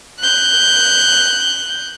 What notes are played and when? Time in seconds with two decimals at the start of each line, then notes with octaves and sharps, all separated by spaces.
0.21 F#6 G6